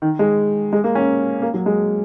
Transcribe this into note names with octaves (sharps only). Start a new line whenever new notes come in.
D#3
G#3
G#3
A#3
C#4
A#3
F#3
G#3